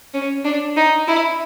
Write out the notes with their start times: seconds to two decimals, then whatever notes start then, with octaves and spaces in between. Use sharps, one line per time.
0.14 C#4
0.44 D4
0.76 D#4
1.07 E4